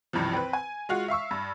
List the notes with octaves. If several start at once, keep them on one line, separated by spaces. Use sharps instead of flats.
C#2 G2 C3 E3 F3
C4 B4
G#5
G#3 F4 F#4
E5 F5 C#6 E6
G2